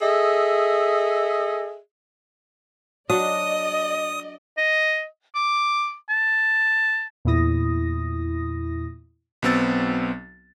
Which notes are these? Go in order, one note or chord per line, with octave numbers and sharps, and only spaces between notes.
G#4 A4 D#5 E5
F#3 D4 F#4 D5 D#5 D#6
D#5
D6
A5
E2 A#2 E4 D#6 A#6
B1 F#3 B3 C4 E6 A6